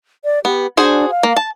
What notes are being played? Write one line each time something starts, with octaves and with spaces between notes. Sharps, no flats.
D5
B3 G4
D4 F#4 G#4 C5
F5
A#3
A5